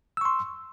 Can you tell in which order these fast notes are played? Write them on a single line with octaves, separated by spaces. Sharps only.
E6 C#6 C6